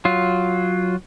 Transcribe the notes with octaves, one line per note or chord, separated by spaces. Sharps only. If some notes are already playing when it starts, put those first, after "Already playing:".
F#3 F4